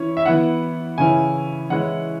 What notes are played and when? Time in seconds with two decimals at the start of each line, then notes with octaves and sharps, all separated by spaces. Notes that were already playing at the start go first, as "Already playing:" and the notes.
Already playing: E3 C#4 E4 C#5
0.17 E5
0.25 E3 B3 E4 F#5
0.98 C#3 E3 C#4 E4 G#5
1.70 E3 G#3 C#4 E4 F#5